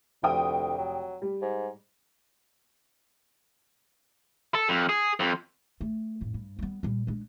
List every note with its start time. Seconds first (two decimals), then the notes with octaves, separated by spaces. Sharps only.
0.23 F1 D2 G5 D#6
0.78 F#3
1.22 G3
1.42 G#2
4.55 A4
4.69 F2
4.89 G#4
5.20 F2
5.81 A3
6.21 F2 A2
6.34 G2
6.59 G3 B3
6.83 A#2 G3
7.07 G#3 D4